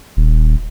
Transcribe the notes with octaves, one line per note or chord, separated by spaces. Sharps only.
D#1